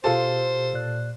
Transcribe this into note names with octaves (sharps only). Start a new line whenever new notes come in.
B2 F4 G4 A4 C5 A5
A#2 D5 F#6